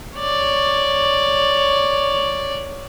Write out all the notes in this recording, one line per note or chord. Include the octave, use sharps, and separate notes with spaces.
C#5 D5